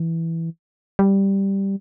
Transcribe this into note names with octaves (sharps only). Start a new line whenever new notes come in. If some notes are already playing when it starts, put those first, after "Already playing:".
Already playing: E3
G3